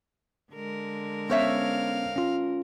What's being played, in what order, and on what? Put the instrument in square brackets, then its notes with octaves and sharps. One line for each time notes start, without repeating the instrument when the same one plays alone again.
[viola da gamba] D3 G#3 A#4
[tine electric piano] B3 C#4 [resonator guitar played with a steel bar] C5 C#5 E5 [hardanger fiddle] F5
[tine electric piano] C#4 F4